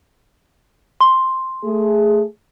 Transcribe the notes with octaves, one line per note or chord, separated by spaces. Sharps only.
C6
A3 G#4